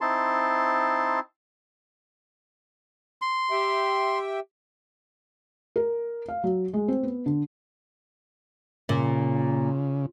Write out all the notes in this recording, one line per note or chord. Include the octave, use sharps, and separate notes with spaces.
C4 D#4 E4 A5 C6
C6
G4 E5 G5
A#4
F5
F#3
G#3
C4
B3
D3
A#2 C#3